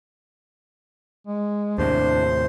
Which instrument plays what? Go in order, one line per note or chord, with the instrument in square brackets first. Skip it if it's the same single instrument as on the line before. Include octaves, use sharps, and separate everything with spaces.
[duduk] G#3
[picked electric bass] D#2 A2 C3 [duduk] D4 [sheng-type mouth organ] C5